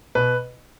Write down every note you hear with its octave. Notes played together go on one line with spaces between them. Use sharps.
B2 B4